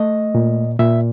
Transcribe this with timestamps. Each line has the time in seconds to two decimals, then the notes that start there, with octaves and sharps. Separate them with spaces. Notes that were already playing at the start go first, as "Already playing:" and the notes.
Already playing: A3 D#5
0.35 A#2
0.79 A#2 E5